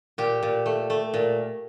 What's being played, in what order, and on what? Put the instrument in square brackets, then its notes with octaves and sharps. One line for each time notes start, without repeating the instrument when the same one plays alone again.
[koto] A#2 G4
A#2
A3
A3
A#2